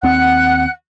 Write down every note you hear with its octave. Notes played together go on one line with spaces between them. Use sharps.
D#2 C4 F#5 F#6